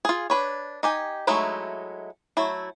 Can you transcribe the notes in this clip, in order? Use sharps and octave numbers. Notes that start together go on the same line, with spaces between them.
F4 G#4
D4 B4 C#5
D#4 G4 G#5
F#3 G#3 A3 D#4 E4
F#3 A3 E4